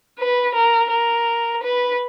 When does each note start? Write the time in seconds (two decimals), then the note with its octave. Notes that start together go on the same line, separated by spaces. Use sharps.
0.19 B4
0.55 A#4
0.90 A#4
1.63 B4